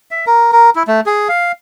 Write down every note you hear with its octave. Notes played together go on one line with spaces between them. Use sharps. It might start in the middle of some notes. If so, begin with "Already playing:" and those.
E5
A#4
A#4
E4
A3
G#4
F5